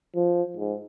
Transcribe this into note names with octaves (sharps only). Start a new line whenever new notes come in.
F3
G#2